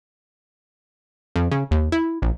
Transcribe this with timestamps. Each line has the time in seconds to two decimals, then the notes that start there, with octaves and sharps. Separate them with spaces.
1.36 F2
1.52 C#3
1.71 D#2
1.92 E4
2.22 A#1